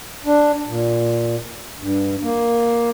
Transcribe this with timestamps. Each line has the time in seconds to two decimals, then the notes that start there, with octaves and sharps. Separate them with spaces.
0.26 D4
0.68 A#2
1.79 G2
2.23 A#3